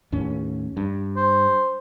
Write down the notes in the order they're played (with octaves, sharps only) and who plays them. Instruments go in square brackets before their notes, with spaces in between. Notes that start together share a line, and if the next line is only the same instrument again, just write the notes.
[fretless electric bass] D#2 A2 C#4
G2
[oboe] C5